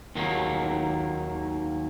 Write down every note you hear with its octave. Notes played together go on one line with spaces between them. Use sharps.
D#2 D#3 F#3 A#3